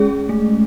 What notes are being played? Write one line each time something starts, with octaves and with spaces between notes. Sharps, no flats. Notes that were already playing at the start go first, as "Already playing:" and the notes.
Already playing: G#3 C#4 G#4
A3